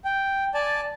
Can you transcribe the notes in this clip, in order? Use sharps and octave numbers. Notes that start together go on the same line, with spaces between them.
G5
D5 G#5 A5